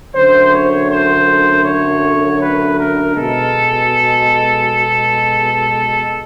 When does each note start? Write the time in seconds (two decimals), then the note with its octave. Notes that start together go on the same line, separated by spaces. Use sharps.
0.14 F#2 D3 F#3 A3 C5
0.52 C#5
0.89 C5
1.64 C#5
2.39 B4
2.77 A#4
3.14 B2 G#3 A4